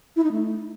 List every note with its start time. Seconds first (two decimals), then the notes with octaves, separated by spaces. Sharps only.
0.16 E4
0.24 D#4
0.32 A3